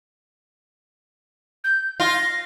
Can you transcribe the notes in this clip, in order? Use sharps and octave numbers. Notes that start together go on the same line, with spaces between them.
G6
F4 A#6